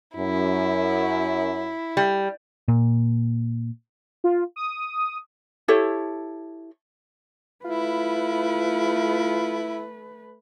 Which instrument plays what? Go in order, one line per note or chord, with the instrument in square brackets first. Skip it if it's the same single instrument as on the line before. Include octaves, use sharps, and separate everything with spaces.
[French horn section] F#2 [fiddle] E4
[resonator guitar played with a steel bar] G3
[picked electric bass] A#2
[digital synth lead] F4
D#6
[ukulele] E4 G4 A4 C#5
[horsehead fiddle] A3 B4 [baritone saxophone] E4 [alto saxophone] F4